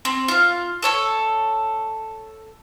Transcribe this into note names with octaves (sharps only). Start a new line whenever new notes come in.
C4
F4 F5
A4 C#5 E6